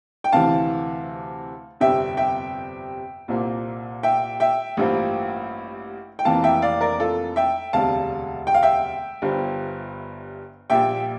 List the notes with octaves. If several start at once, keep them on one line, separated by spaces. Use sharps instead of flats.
G5
D2 C3 E3 F5 A5
G1 F2 C3 G3 E5 G5
E5 G5
C2 A#2 F3 A#3
E5 G5
E5 G5
A1 G2 F3 A#3
G5
F1 F2 E3 A#3 F5 A5
E5 G5
D5 F5
A#4 D5
F4 A4
E5 G5
E1 D2 C3 G3 F5 A5
G5
F5
E5 G5
G1 G2 F3
A#1 A#2 G3 E5 G5